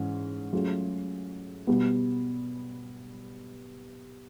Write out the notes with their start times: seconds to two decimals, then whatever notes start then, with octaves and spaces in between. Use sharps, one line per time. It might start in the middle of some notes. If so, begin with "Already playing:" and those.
Already playing: G#2 E3 C#4
0.53 F#3 A3 C#4 F4 G#4
1.67 B2 G3 B3